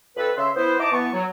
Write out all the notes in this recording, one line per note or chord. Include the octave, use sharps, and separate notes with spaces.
F2 A4 B4
C#3 E5 C6
B3 E4 C5
D#4 E4 A5 A#5 D6
E3 B3 A5 C#6
F#3